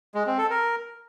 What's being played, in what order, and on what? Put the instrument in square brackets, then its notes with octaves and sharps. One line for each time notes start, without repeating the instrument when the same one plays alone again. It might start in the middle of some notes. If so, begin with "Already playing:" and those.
[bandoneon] G#3
C4
A4
A#4